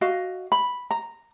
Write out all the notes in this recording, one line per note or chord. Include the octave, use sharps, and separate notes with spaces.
F#4 D#5 F5
B5
A#5